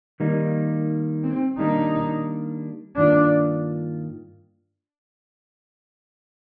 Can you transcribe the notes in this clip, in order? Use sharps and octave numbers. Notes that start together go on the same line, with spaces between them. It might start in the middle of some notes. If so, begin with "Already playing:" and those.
D#3 G3 A#3 D#4
C4
D#3 G3 A#3 D4 D#4
G2 D#3 A#3 D4 F4